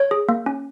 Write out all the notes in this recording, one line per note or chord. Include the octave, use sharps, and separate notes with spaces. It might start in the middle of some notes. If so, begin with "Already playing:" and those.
Already playing: C#5
G#4
A#3
C#4